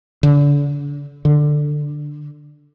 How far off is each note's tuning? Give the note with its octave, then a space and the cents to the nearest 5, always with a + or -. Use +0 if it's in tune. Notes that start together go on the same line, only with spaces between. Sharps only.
D3 -35
D3 +10